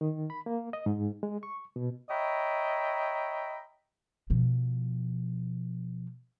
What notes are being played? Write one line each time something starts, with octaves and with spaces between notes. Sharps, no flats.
D#3
B5
A#3
D#5
G#2
G#3
C#6
B2
C#5 D#5 E5 G5 A#5 B5
B2 F3